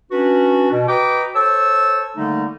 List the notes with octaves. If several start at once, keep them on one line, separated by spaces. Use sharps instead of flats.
C#4 D4 F#4 B4
B2
F#4 B4 D#5 G5 A#5 D6
A4 C5 C#5 A5 E6
D3 D#3 G3 A3 A#3 D#4